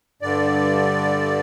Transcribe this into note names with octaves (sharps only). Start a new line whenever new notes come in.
G2 D3 D5